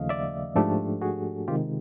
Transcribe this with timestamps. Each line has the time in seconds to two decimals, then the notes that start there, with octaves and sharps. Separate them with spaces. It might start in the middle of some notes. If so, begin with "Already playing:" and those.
Already playing: D#2 C#3 F3 A3 D#5 F5
0.09 D5 E5
0.55 G#2 F3 A3 D4 G4 A4
1.02 F#4 G#4
1.48 C3 D#3 G#3 F4 G4